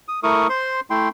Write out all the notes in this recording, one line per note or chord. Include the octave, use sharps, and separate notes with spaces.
D#6
A3 E4 A#4 C#6 D#6
C5 C6
A3 E4 G5 C6